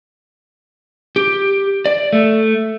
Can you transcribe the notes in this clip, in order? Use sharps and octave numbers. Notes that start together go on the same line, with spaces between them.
G4
D5
A3